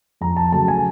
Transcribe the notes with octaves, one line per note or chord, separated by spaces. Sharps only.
F2 A#5
A5
C#3 F#3 A3 A5
G#5